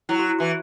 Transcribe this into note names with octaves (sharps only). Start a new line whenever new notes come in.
F#3 E4
F#4
E4
E3 F#4